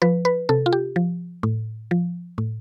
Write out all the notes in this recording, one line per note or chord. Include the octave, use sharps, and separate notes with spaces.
F3 B4
B4
C3 A4
F4
G4
F3
A2
F3
A2